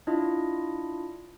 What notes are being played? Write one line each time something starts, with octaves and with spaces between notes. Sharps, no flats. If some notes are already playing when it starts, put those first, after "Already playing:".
D4 E4 F4 D#5